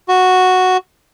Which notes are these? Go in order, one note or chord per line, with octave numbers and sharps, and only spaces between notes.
F#4